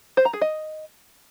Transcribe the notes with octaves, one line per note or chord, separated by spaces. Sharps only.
C5
A#5
G#4
D#5